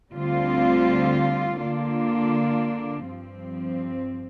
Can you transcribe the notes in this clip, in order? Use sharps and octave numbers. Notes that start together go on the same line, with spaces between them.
D2 D3 G3 C4 F4
D3 A#3 D4 F4
G2 F3 C4